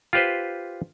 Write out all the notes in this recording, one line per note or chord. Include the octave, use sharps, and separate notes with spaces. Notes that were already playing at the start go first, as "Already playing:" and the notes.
F4 G4 B4 C5